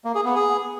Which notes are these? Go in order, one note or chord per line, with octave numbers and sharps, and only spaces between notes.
A#3
G#4
B3
G#4